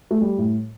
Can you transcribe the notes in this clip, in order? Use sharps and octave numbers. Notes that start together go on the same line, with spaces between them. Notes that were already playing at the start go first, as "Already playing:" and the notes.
A3
G3
A2